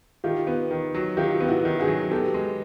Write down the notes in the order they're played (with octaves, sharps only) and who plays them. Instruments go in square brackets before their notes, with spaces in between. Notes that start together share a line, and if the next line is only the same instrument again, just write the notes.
[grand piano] D#3 [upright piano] F4 G4
[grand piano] B3
D#3
F#3
[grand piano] D#3 [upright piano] F4 G4
[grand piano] B3
[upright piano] E4 F#4
[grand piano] D#3
[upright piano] F#4 G#4
[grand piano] F#3
[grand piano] B3 [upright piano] G4 A4
[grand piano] G#3